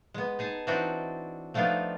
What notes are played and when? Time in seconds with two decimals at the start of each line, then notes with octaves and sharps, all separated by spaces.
0.14 G#3 B3
0.39 D#4 G#4 A5
0.67 E3 C4 D4 D#4 F#4
1.54 F3 A3 B3 D4 D#4 F4